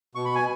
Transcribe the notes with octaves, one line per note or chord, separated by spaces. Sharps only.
B2 C#6
B5
G#5